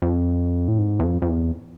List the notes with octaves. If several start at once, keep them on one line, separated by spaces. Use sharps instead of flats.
F2
A2
G#2
E2
F2
F2
E2